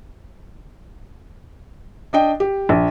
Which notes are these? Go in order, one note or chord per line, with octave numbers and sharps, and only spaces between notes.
D4 D#5 G5
G4
A#1